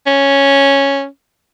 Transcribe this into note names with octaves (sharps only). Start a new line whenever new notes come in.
C#4